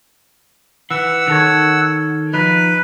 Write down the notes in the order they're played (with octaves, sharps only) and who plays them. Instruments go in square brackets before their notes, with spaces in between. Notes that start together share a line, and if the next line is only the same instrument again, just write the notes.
[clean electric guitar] E3 [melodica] F#5 E6
[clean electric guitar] D#3 A4 C#5
[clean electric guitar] F3 D#4 [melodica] B4